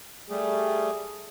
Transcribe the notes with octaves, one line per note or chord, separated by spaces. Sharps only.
G3 A3 G#4